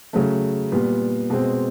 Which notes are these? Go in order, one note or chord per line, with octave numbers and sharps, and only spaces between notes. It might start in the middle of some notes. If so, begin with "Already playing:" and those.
C#3 F#3 A3
A#2 G3 B3
B2 G#3 C4